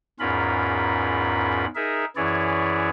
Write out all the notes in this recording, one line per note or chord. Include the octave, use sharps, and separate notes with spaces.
E2 G#2 C#4 F4 A#4 B5
D#4 G#4 A#4 E5
F#2 E3 E4 G#4 C#5 D5